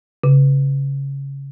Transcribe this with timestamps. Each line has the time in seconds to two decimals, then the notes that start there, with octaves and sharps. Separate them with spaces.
0.24 C#3